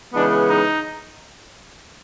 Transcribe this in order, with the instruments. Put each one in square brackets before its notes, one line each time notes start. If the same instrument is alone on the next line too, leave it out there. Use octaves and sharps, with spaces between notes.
[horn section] C#3 E3 G#3 B3 D4
D#4